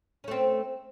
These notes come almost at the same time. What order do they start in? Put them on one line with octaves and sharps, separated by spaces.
C#4 A3 C4